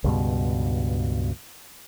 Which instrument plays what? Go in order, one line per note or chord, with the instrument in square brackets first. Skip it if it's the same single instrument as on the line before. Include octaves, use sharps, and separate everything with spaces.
[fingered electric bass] C#2 G2 B2